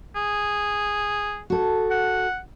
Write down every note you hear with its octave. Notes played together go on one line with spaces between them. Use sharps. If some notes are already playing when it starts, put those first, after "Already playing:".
G#4
F#4 A4
F#5